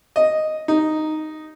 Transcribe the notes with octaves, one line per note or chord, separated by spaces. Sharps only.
D#5
D#4